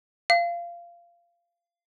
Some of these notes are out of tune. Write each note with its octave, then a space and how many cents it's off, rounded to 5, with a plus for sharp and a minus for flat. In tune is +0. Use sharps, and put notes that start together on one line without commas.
F5 -20